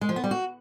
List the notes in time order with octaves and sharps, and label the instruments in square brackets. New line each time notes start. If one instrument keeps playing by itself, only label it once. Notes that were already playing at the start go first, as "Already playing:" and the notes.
[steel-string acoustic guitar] G#3
F3
B3
G3
F#4